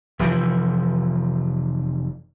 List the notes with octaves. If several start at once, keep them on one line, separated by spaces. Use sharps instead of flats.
F1 E3 F3